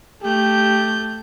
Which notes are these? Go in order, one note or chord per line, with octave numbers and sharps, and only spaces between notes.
A3 G4 G6